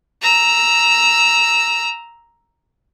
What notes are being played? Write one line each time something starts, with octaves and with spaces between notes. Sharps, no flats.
A#5 E6